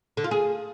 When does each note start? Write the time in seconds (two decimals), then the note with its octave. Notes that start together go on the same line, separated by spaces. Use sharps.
0.17 D3
0.24 F4
0.31 G#4